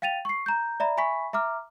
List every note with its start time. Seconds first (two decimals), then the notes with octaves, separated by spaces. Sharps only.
0.02 F5 G5 A6 D#7 F7
0.25 C#6 C7
0.46 A#5 G6
0.80 D5 E5 A#5 B5
0.97 E5 G#5 B5 C#6 B6
1.33 E5 A#5 D6 F6